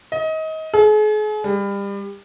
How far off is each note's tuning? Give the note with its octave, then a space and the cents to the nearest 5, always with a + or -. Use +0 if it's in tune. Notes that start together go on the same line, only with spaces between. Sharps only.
D#5 +25
G#4 +40
G3 +30